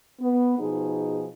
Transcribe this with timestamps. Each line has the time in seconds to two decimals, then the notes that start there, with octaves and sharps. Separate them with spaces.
0.20 B3
0.59 B2 F3 D#4 G#4